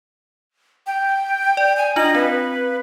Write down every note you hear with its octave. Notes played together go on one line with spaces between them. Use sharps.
G5
D5
G#5
D4 F4 D#5 F#7
C4 B4